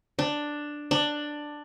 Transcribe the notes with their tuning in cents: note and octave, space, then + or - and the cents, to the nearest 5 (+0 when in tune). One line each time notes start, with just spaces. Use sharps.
D4 +5
D4 +10